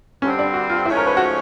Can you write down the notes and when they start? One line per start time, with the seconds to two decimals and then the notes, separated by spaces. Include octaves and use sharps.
0.22 G2 D3 G3 C4 C#4
0.39 D4
0.54 F#4
0.69 F4
0.86 G#2 F3 A3 C#4 E4
0.97 A#4
1.07 B4
1.17 F#4